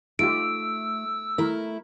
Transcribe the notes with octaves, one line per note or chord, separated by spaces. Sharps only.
A3 D#4 F4 G4 E6 D7
A3 E4 A#4